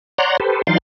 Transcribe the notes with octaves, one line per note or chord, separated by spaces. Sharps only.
C#5 D5 F#5 A#5 C6
G4 A4 B4 C5
E3 F#3 D#4 D5 F5 C6